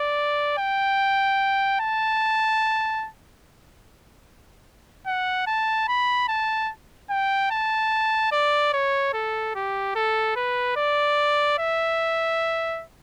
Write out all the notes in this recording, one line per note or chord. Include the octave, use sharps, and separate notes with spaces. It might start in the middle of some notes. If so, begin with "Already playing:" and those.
Already playing: D5
G5
A5
F#5
A5
B5
A5
G5
A5
D5
C#5
A4
G4
A4
B4
D5
E5